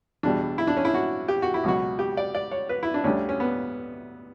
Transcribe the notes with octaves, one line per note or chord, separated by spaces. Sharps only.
E2 B2 G3 D4
E4
D4
C#4
E4
F#4
G4
F#4
E4
C#2 B2 F#3 F#4
G4
D5
D5
C#5
B4
E4
D4
D2 D3 G3 C#4
C#4
B3